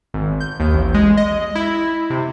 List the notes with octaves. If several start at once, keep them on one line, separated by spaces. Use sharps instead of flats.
G#1
G6
D#2
A1
G#3
D#5
E4
C3